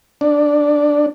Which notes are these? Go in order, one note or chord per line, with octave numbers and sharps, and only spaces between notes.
D4